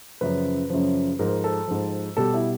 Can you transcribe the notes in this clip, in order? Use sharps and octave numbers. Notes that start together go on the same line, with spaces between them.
F#2 C#3 F3 B4
F#2 C#3 F3
G#2 F3 A#4
A4
G#2 F3
B2 G3 A4
E4